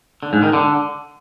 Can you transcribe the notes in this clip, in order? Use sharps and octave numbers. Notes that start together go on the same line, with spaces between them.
D3
G#2
D#3
D3